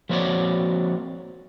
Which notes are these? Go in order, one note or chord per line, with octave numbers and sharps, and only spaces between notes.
F3 A#3 C4 F#4 C#5 D5